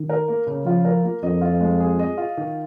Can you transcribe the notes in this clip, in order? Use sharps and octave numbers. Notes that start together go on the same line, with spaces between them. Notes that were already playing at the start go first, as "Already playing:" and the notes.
Already playing: D#3
A#4
A#3
C#3
F3 F4
A#4
A#3
F2 D#5
F4
G#3
G#4
D#5
F4
D#3